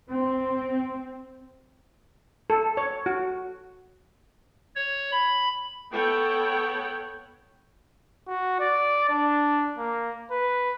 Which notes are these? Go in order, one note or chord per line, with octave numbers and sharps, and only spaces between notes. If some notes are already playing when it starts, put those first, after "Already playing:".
C4
A4
C#5
F#4
C#5
B5
B3 A4 C#5 F#5 G5
F#4
D5
D4
A#3
B4